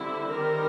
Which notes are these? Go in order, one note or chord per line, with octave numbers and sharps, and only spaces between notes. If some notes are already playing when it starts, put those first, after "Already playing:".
Already playing: D3 G3 C4 E4
D#3 G3 C4 A#4